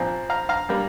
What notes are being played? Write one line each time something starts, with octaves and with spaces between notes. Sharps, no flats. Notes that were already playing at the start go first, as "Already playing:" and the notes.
Already playing: A#2 F3 C4
F5 A#5
F5 A#5
G3 A#3